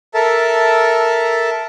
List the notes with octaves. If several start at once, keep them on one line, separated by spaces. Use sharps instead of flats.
A4 A#4 E5 A5